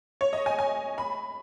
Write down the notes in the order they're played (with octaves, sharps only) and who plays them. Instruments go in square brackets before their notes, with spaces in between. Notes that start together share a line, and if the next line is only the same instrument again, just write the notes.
[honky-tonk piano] C#5
D#5
G#5
G#5
B5